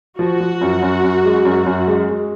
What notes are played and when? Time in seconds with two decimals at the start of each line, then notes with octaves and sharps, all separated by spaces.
0.19 F3 F#4
0.40 F3
0.61 F#2
0.82 F#2
1.03 F#2
1.25 G#3
1.45 F#2
1.66 F#2
1.87 G#3
2.09 G#3